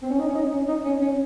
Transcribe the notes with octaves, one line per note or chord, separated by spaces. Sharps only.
C4
C#4
D#4
C#4
D#4
C#4
D#4
C#4
C#4